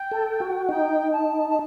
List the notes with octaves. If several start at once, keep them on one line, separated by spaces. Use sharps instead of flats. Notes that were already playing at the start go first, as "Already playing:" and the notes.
Already playing: G5
A4
F#4
D#4 G5
A5
A5